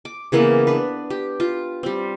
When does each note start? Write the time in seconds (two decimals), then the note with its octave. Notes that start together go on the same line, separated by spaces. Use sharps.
0.05 D6
0.32 C#3 E3 A#3 B3
0.67 D4 B4
1.10 G4
1.40 F4
1.83 G3 C4